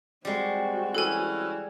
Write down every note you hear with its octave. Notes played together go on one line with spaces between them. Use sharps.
G3 G#3 C4 F#4
E3 C#4 E4 A4 G#5